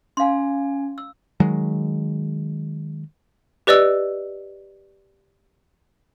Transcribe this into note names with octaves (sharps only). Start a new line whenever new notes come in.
C#4 F5 G#5 C6
E6
D#3 F#3 G#3
G4 B4 D5 D#5 E6